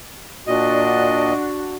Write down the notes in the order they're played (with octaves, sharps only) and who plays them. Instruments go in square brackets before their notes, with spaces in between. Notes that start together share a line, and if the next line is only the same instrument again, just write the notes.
[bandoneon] A#2 D#5 [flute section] D4 F#4